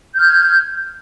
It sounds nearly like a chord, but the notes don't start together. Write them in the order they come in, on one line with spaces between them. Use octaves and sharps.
G6 F6 G#6